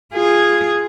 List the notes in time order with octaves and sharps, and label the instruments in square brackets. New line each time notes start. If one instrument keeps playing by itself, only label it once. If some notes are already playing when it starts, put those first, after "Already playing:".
[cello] F4 G#4